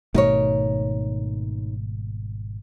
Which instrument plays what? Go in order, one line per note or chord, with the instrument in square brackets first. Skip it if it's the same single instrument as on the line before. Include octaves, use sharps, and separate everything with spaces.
[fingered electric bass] G#1 B2 A3 [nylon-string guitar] D#4 A#4 C#5